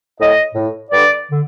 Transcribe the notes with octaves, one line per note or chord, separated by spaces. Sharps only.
A2 D#5
A2
G2 D3 D5
D3